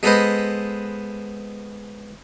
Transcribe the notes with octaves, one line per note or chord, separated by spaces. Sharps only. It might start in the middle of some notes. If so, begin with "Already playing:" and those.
G#3 B3 A4 B4 C5 D#5